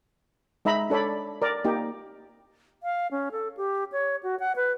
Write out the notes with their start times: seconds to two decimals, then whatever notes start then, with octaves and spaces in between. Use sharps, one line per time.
0.65 G#3 D#4 E5 A#5 B5
0.90 D4 A4 C#5 D5 B5
1.42 A#4 D5
1.64 A#3 D#4 G4
2.83 F5
3.11 C#4
3.32 A4
3.57 G4
3.92 C#5
4.23 F#4
4.40 F#5
4.56 B4